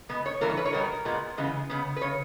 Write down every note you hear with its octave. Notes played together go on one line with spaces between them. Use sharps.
B2 G#3 B3
C#5
G2 E3 A#3 A#4
C#5
B4
C#5
B2 G3 B3 A#4
A#2 G#3 B3
C#3 E3 G#3 B3
C#3 G#3 B3
B4
C#3 C#5